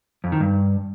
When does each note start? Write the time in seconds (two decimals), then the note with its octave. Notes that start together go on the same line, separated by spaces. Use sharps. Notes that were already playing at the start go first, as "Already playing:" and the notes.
0.24 F2
0.32 D#3
0.40 G2